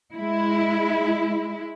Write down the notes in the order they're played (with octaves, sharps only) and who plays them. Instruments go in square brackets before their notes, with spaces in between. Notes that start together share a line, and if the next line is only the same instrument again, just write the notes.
[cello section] G#3 E4